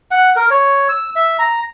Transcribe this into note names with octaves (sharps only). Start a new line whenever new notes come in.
F#5
A#4
C#5
E6
E5
A#5